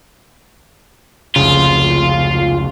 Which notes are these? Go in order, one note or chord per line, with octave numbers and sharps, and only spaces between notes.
F1 C#2 C#3 F4